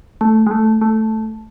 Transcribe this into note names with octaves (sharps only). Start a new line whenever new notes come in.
A3
G#3
A3
A3